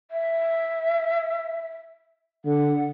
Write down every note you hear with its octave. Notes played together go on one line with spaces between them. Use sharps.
E5
D3 F#5